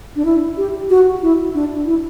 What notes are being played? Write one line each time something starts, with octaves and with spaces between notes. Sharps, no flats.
D4
E4
G4
F#4
E4
D4
E4